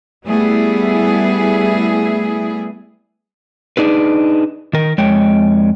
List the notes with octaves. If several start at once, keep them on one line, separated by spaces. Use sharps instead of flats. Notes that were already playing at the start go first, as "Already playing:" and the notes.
G3 A3 B3 E4 G#4
D4 D#4 G#4 B4
D#3 A#4
F2 G#3 C#5 G5